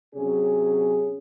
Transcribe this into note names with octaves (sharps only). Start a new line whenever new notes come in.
C3 F#3 C#4 G#4